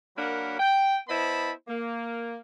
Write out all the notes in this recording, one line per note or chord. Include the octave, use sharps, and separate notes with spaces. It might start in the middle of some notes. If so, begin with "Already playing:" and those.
F#3 A#3 D4 A#4 F#5 B5
G5
B3 E4 C5 D#5 A5 B5
A#3